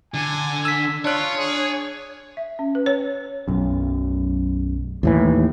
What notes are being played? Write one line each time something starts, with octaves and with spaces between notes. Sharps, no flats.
D3 G#5
E6 B6
D4 F4 C#5 F#6
G#4
E5
C#4
B4
C#5
B1 F#2
D#2 A2 E3